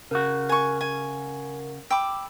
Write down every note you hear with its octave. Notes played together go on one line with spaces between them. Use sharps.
C#3 F#4 A#4
A#4 G#5 C#6
G#5
G5 B5 D6 E6